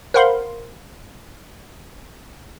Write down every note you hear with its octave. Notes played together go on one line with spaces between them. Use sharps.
A#4 C5 F5 F#5 B5 C6